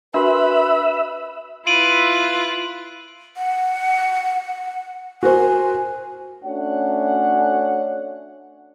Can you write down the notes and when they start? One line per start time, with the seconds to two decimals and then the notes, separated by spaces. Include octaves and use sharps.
0.14 D4 F#4 A#4 B4 E5 B5
1.67 E4 F4 B4 D7 D#7 F#7
3.37 F#5
5.23 F#4 A#4 C5 G#5
6.44 A3 C#4 D4 F#4 C#5 F#5